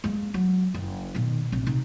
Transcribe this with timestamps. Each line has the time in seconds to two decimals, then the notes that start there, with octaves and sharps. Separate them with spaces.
0.04 G#3 A#3
0.34 F#3
0.74 F#1
1.15 B2 D#3
1.52 A#1 C3
1.67 C3 D#4